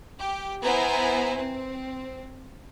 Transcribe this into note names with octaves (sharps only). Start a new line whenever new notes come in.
G4
B3 E4 B4 C5 G#5 A#5
C4